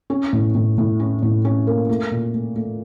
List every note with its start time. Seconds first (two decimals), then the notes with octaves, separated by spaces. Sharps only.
0.10 C#4
0.33 A2
0.55 A2
0.78 A2
1.00 C#4
1.22 A2
1.45 C#4
1.67 A#3
1.89 A3
2.11 A#2
2.34 A3
2.56 A3